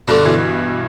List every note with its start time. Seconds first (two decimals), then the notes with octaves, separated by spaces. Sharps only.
0.08 G2 B2 D3 A3 D4
0.25 B2 E3